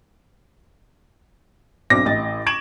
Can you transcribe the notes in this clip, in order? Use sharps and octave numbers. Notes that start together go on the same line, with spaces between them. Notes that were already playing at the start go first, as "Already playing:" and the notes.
B1 C4 D4 D6 A#6
A1 D#5 A6
C#6 G#6 D7 E7 F#7